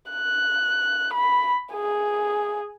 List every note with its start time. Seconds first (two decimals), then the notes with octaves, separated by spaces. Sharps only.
0.11 F#6
1.13 B5
1.73 G#4